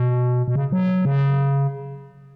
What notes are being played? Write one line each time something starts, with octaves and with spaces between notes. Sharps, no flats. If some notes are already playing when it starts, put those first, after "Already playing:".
Already playing: B2
B2
C#3
F#3
C#3